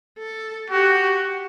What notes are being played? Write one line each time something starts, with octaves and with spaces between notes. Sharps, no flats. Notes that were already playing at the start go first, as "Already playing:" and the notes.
A4
F#4 G4